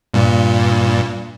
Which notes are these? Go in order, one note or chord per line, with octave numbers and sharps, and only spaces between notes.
G2 A#2